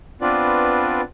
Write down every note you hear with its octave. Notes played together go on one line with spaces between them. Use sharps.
B3 C4 D4 F4 B4 D5